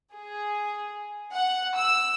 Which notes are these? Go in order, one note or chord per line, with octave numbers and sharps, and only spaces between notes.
G#4
F#5
E6